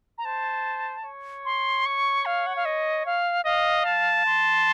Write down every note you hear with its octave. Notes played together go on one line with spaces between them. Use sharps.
A#5
C5 A5
C#5
C6
C#6
F5
F#5
F5
D#5
F5
D#5 F5
A5
C6